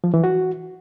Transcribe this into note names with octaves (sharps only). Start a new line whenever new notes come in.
F3
E3
F#4